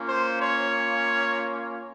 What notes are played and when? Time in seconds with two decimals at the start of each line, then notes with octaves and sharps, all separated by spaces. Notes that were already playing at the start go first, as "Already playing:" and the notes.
Already playing: A#3 C#4 F4
0.08 C5
0.41 C#5